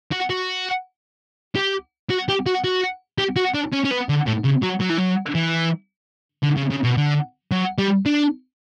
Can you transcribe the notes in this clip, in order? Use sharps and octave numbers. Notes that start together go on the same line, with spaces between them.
F#4
F#4
G4
F#4
G4
F#4
F#4
G4
F#4
D4
C#4
C#4
B3
D3
A2
C#3
F#3
F#3
E3
F#3
E3
D3
C#3
C#3
B2
D3
F#3
G3
D4